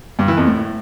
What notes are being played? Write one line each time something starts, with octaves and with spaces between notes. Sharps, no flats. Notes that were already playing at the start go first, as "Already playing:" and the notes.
G2
E3
F2
A2